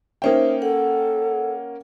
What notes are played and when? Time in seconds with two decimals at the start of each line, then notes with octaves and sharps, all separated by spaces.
0.22 A#3 C#4 D#4 C5 E5 G5
0.62 A4 F#5